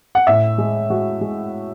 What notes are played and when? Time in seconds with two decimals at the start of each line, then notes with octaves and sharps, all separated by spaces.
0.15 F#5
0.27 A2 E5
0.58 G#3
0.90 G#3 F#4
1.21 G#3